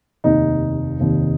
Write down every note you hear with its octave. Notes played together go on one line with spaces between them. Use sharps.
F1 D#2 D#3 D#4
F1 D#2 D#3